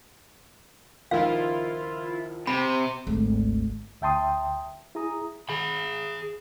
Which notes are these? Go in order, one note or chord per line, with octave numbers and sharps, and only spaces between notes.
C#2 D#3 F3 E4 F4 F5
C3 B5
G#1 D2
D2 E5 G5 A5 C6 D#6
E4 G#4 A#5 D#6
G#4 B5